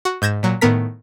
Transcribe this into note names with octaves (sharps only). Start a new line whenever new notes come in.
F#4
G#2 G6 G#6 A#6 E7
A#2 F#3
A2 D#3 B3 A#4 B6